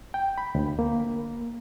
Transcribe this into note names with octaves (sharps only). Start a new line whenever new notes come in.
G5
B5
D2
A#3